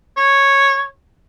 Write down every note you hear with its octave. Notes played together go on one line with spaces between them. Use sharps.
C#5